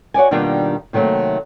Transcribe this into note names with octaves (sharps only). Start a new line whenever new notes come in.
F#4 C#5 D5 G#5
B2 D#3 G3 A#3 D4 F4
C3 D#3 F#3 A3 A#3